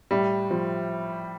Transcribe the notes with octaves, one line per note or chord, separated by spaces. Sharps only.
A2 G3
F3